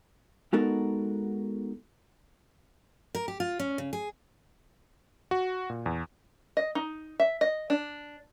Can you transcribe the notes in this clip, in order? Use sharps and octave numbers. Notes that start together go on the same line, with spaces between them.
G#3 B3 D#4 F#4 A4 A#4
A#4
G4
F4
C#4
C#3
G#4
F#4
A#2
E2
D#5
D#4
E5
D#5
D4